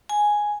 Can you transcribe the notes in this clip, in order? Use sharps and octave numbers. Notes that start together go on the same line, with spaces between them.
G#5